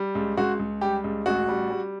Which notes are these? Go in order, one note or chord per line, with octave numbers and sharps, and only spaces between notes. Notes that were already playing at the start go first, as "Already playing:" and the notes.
Already playing: G3
C#2
C#2 F#4
C#2
G3 G4
C#2
A1 F#4
G3
G3